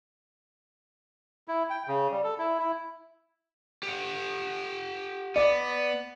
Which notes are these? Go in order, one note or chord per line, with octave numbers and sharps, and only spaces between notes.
E4
G5
C#3
G3
A4
E4
E4
G4 F#5
B3 D5 D6